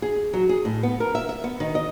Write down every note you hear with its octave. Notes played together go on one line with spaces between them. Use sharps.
G#4
F#3
G#4
A2
B3
A#4
E5
E5
B3
D#3
D#5